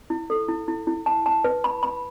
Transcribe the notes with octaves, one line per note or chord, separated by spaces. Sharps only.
E4
A4
E4
E4
E4
A5
A5
B4
B5
B5